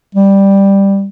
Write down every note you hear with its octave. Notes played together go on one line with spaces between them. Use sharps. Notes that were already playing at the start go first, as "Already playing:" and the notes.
G3